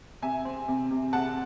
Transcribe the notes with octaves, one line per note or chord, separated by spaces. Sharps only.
C3 E5 G#5
C4
C3
C3
C3 F#5 A5